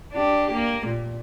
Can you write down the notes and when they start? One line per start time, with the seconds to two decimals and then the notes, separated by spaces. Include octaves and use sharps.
0.13 D4 G4
0.53 A#3
0.87 A#2